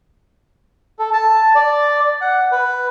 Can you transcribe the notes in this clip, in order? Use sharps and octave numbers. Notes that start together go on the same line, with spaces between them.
A4
A5
D5
F#5
B4